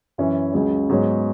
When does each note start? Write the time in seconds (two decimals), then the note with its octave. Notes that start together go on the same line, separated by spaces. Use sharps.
0.18 F#2 E3 C#4 E4
0.54 C#2 C#3 F#3 C#4
0.89 G#2 F#3 B3 G#4 C#5